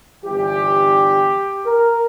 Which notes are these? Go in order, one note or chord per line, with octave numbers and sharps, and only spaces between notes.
G1 G2 E3 G3 G4
A#4